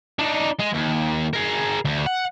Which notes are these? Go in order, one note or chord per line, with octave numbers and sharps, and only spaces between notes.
D4 D#4
G#3
D#2
G#4 A#4
D2
F#5